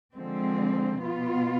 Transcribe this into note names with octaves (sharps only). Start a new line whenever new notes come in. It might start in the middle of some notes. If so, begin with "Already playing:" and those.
D3 F3 G#3 C4
B2 B3 F4